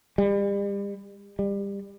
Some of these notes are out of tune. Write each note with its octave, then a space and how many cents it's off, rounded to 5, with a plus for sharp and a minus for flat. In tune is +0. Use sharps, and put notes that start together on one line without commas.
G3 +35
G3 +25